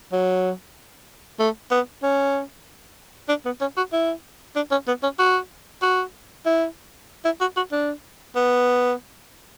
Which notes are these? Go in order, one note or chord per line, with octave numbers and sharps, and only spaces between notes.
F#3
A3
B3
C#4
D4
B3
C#4
F#4
E4
D4
C#4
B3
C#4
F#4
F#4
E4
E4
F#4
F#4
D4
B3